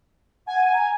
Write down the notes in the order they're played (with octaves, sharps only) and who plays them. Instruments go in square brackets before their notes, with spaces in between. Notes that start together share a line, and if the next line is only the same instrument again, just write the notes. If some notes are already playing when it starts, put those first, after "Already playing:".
[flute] F#5 [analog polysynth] G#5
[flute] A#5